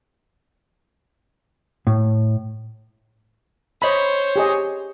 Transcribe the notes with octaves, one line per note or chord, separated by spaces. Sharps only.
A2
C5 C#5 D#5 B5
G4 G#4 D#5